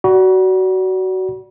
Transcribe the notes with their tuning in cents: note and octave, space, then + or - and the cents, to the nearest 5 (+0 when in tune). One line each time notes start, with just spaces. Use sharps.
F#4 +20 D5 -20 B5 -45